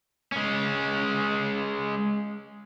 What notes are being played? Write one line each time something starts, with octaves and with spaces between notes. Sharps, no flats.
G#3 C#4